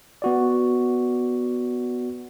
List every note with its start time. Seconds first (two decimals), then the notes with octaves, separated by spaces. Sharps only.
0.22 B3 F#4 D5